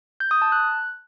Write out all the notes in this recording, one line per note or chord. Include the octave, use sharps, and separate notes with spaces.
G6
D#6
A5
F#6